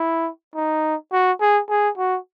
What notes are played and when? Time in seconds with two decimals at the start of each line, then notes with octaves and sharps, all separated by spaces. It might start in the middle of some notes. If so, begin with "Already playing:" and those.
Already playing: E4
0.55 D#4
1.12 F#4
1.41 G#4
1.69 G#4
1.98 F#4